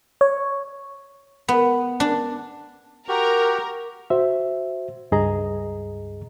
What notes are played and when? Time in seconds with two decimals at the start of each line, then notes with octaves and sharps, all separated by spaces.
0.21 C#5
1.48 B3
2.00 D4
3.08 F#4 G4 A#4
4.10 F#4 C5 E5
5.12 C#2 G2 G#4 D#5 A#5